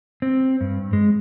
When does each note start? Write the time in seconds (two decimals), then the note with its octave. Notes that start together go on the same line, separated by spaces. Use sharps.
0.22 C4
0.61 G2
0.93 G#3